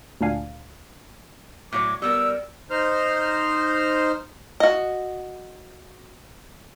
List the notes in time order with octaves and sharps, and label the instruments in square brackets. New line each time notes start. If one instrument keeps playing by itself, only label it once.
[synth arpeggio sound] D2 A#2 D4 F5 G#5
[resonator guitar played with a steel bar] A2 F#3 C#5 [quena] D6
[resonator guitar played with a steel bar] G3 B3 A#4 [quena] E6
[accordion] D#4 C5 F6
[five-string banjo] F#4 D#5